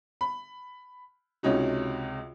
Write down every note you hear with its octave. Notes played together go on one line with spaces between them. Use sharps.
B5
C#2 C3 C#4 D#4 F#4